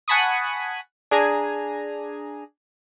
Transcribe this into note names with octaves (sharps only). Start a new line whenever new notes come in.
F#5 G#5 A5 B5 C#6 D#6
D4 G#4 G#5 A#5